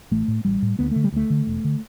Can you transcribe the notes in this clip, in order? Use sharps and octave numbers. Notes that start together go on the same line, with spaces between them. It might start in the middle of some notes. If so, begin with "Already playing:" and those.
A1 A3
A2
A1 G3
A2
D2 B3
D3 A3
G3
D2 A3
D3
E1
D3